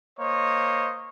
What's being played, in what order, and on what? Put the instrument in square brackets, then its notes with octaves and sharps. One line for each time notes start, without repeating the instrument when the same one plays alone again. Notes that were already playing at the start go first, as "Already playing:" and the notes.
[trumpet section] A#3 C5 C#5 D#5